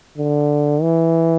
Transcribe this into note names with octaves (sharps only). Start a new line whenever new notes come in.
D3
E3